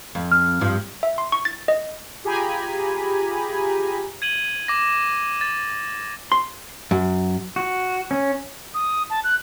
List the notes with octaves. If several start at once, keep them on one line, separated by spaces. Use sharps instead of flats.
F2
F6
G2 F3
E5
C6
C#6
A6
D#5
F4 G4 G#4 G#5 A#5 B5
G#6 D#7 F#7 G7
D6 A#6
A6
C6
F#2
F#4
C#4
D#6
A5
F#6